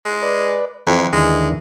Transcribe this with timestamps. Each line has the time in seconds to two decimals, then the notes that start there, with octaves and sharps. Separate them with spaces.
0.05 G#3
0.22 B4 D5
0.87 F2 E3
1.13 D#2 D3 E3 G#3